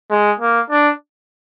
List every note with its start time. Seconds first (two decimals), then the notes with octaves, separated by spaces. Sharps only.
0.11 G#3
0.40 A#3
0.70 D4